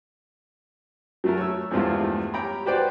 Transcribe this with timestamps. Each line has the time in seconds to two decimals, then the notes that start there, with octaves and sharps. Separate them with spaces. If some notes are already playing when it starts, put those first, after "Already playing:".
1.24 F#3 A3 A#4
1.38 C#5 E6
1.71 E2 G2 F3 G#3 A3 F4
2.34 G4 C#5 G5 A#5 B5
2.66 F#4 G4 B4 C5 D5 G5